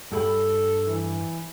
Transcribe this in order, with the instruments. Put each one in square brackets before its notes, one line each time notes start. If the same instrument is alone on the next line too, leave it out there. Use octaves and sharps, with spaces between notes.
[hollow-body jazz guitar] G2 G4 B5 [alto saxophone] A4
[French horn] E3